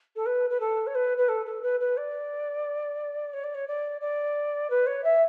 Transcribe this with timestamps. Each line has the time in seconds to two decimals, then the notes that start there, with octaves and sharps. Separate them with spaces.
0.16 A4
0.26 B4
0.50 B4
0.60 A4
0.87 C#5
0.95 B4
1.18 B4
1.29 A4
1.46 A4
1.63 B4
1.80 B4
1.97 D5
3.34 C#5
3.44 D5
3.54 C#5
3.68 D5
4.01 D5
4.70 B4
4.87 C#5
5.04 E5